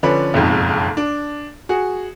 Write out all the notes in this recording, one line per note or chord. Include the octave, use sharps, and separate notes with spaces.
D3 F3 C#4 D4 B4
F#1 B1 F2 G#2
D4
F#4 G#4